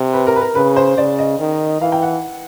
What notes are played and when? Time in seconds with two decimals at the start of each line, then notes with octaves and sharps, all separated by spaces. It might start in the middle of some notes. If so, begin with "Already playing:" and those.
Already playing: C3
0.13 B4
0.27 A#4
0.36 B4
0.41 A#4
0.55 C#3 B4
0.76 C5
0.97 C#3 D5
1.19 D#5
1.39 D#3
1.81 E3 F5
1.92 G5
2.02 F#5